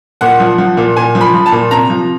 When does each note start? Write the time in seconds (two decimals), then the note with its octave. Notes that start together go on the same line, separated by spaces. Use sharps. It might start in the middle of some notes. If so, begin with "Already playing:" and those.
0.21 A#2 F#5
0.40 F3
0.58 F3
0.77 A#2
0.96 A#2 G#5
1.15 F3
1.21 B5
1.34 F3
1.46 A5
1.52 A#2
1.71 C3 A#5
1.90 F3